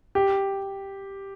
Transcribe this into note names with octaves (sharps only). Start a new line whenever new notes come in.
G4